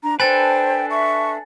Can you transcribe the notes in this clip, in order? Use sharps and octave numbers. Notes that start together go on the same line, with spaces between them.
D4 A#5
D4 A4 B4 C5 G5 G#5 A6
E5 C#6